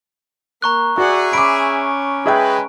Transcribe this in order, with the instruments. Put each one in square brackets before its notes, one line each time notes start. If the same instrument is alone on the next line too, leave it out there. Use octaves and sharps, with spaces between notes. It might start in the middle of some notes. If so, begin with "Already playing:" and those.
[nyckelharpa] A#3 [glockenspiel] A#5 C#6 F#6
[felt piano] F#4 [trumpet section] G#4 E5 [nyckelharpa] D5 F#5
[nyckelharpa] C#4 [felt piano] B5 D6 [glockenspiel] D7
[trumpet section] G#3 B4 [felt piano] G#4 E5 G5